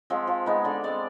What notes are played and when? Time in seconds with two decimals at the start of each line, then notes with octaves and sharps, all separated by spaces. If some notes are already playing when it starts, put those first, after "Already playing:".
0.10 F3 G#3 C4
0.27 F3
0.46 G#3 B3 D#4
0.65 D3 D5
0.84 G#3 C4 D5